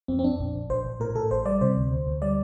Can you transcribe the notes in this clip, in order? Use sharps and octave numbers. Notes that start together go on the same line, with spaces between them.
F2 C4
C4
F2 D4
A#1
A#1
A#1 C5
A#1
A2 A#4
A2 A4
A1 C5
G3 D5
C3 C5
D2
D2
D2
G3 D5